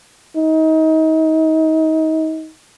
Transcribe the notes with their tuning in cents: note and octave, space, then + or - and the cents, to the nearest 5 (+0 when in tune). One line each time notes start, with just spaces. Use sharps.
D#4 +30